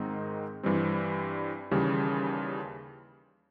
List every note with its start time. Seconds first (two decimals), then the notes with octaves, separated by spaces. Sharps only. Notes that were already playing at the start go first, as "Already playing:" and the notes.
Already playing: G#2 D#3 G#3 C4 D#4
0.63 G2 E3 G3 C4
1.71 D#2 C#3 E3 G3